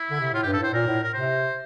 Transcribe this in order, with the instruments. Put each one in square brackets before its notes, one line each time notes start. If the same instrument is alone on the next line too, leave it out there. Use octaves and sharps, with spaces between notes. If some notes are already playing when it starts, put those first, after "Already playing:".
Already playing: [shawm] E4
[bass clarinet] D3
C3
[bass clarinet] A2 [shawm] F4
[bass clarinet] G2 [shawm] G4
[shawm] A4
[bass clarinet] A2 [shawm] C5
[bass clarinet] A#2 [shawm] A#4
[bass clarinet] A2
[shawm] A#4
[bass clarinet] C3 [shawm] C5